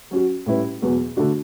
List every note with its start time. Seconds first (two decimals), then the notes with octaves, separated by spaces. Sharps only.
0.11 F#3 C#4 F#4
0.46 A2 G3 C#4 E4 B4
0.82 E2 B2 F#3 B3
1.17 D3 A3 D4 F#4